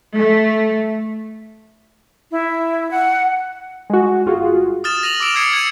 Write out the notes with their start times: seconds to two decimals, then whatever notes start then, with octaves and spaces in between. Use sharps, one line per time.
0.17 A3
2.31 E4
2.90 F#5
3.90 G#3 F#4
4.26 G1 F4 F#4 G#4
4.84 D#6 F6 A6 E7
5.03 A#6 D#7 F7 F#7
5.20 D6 E6 D7 E7 F7
5.35 D#6 F6 G#6 C7 C#7
5.53 G#6 C#7 D#7